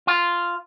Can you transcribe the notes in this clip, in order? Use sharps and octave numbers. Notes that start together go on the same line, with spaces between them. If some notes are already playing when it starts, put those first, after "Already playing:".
F4